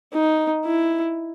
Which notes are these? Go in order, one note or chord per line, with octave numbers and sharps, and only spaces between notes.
D#4
E4